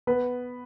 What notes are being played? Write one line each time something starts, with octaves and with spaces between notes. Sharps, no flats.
B3 B4